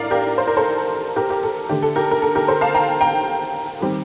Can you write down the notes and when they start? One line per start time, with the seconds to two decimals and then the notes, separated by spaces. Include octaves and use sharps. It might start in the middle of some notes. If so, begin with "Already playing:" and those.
Already playing: A2 D4 A#4 D5 F5
0.11 G4 A#4
0.38 C5
0.48 A#4
0.57 A4 C5
1.16 G4 A#4
1.30 G4
1.43 A4
1.69 D3 A3 D4 G4
1.82 A4
1.96 G4 A#4
2.11 A#4
2.22 A4
2.35 G4 A#4
2.48 A4 C5
2.61 F5 A5
2.74 G5 A#5
3.01 G5 A#5
3.80 D#3 G3 C4